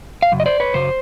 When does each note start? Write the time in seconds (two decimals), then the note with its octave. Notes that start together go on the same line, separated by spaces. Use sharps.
0.22 F5
0.32 F#2 C#3
0.40 D#5
0.46 C5 D5
0.60 B4 C#5
0.74 F#2 C#3 F#3 C5